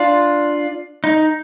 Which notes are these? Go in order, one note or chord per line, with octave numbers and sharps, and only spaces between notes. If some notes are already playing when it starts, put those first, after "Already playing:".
Already playing: D4 F4
D#4